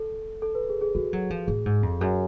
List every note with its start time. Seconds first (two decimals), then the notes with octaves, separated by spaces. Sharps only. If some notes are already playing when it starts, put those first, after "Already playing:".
Already playing: A4
0.42 A4
0.55 B4
0.69 G#4
0.81 G#4
0.95 G#3 F#4
1.13 F#3
1.30 F3
1.47 A2 G#4
1.66 G#2
1.83 F2
2.00 F#2 G#4